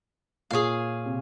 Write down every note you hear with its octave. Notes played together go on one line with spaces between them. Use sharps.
A#2 G#4 C#5 F5
C3